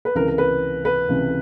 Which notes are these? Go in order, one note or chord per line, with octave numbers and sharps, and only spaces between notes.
B4
C#2 C3 E3 A#4
A#4
B4
B4
C#2 C3 E3